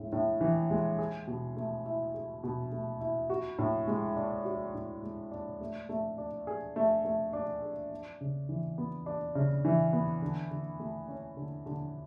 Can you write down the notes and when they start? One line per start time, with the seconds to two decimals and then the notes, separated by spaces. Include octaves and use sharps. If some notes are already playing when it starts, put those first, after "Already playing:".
Already playing: A2 G#3
0.12 A2
0.41 E3
0.70 G#3
0.99 G#4
1.27 B2
1.57 A3
1.86 E4
2.14 G#4
2.43 B2
2.72 A3
3.01 E4
3.30 F#4
3.59 A2
3.88 G#3
4.16 D4
4.45 F#4
4.74 A2
5.03 G#3
5.31 D4
5.61 A3
5.89 A3
6.18 D4
6.47 G#4
6.76 A3
7.05 A3
7.33 D4
7.62 G#4
7.91 D4
8.21 C#3
8.49 E3
8.78 B3
9.06 D4
9.35 C#3
9.65 E3
9.93 B3
10.22 D3
10.51 D3
10.80 A3
11.08 C#4
11.37 D3
11.66 D3